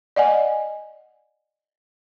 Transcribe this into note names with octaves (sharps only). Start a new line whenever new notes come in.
D5 D#5 F#5 G#5